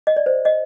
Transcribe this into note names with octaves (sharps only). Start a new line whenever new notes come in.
D#5
D5
C5
D#5